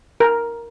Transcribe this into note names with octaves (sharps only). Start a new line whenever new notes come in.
A#4